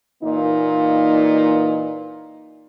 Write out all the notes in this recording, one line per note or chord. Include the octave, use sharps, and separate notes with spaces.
A#2 E3 A#3 D#4